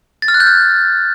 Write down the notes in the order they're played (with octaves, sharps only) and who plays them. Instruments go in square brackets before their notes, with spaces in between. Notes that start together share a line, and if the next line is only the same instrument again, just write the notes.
[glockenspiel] A6
F6
F#6
G6
F6